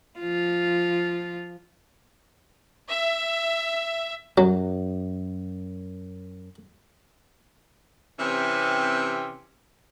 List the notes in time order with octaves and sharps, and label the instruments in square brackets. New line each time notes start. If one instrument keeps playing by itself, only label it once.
[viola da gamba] F3 F4
[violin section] E5
[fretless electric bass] F#2 [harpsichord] F#3
[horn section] C3 E3 C4 C#4 G4 G5